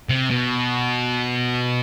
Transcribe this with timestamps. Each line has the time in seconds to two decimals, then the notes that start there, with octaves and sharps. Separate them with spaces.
0.09 C3
0.30 B2